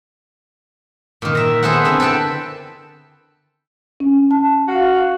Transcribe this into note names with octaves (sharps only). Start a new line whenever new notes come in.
A#2 D#3
E5 A#5
B3 G#4 A4 C5 E5 F#5
D3 C4 E4
A4 B4 G5 A5
C#4
A5
F#4 F5